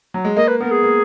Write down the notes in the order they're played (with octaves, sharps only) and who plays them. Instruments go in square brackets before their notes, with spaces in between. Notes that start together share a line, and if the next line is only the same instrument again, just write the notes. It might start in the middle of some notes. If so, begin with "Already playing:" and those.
[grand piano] F#3
G#3
[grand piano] A#3 [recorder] D#5
[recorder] B4
[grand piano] B3 [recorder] A#4
[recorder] G#4
[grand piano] A#3